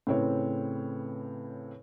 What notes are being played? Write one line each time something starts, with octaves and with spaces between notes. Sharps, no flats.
A2 C#3 C4 B4 C#5